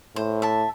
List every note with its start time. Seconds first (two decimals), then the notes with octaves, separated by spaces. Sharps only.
0.16 A2 C5
0.42 E5 A5